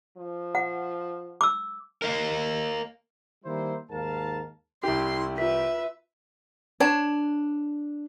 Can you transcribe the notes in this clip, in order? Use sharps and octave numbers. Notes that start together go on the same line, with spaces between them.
F3
F#5
D6 E6
A#4 D#5 F5
D#3 G3 A#3 E4 C5
D#2 G#2 A#4 F5 A5
C2 E4 G4 C6
F4 B4 E5 B6
D4 C#5 A5